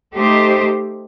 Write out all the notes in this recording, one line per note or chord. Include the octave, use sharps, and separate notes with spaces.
A3 D#4 G4 C5